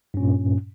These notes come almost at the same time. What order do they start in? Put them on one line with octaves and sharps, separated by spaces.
G2 C#4 A#2